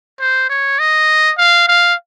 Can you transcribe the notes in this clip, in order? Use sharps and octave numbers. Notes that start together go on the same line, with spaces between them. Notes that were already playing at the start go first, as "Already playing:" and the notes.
C5
C#5
D#5
F5
F5